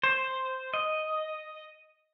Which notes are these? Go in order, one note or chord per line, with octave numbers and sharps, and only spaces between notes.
C5
D#5